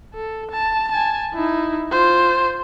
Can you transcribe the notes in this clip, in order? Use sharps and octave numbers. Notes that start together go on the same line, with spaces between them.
A4
A5
G#5 A5
D#4 E4
F4 C5